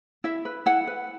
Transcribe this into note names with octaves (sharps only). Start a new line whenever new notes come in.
E4 E5
B4
E4 F#5
B4